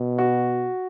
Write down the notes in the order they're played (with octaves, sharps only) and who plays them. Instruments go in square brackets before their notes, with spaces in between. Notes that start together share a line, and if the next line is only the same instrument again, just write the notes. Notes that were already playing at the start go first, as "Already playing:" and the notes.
Already playing: [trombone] B2
[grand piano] F#4